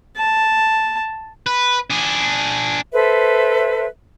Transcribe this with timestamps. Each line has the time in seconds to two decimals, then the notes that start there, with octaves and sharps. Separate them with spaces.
0.17 A5
1.47 B4
1.90 D4 G#4
2.92 A4 B4 C5 E5